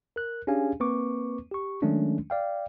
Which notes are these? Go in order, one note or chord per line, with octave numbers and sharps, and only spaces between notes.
A#4 F#6
C#4 D4 G4 G#4 F5 G#5
A#3 C4 B4 C#6 D6
G4 C#6
D#3 F#3 G#3 A3 C#4 D4
D5 F5 G5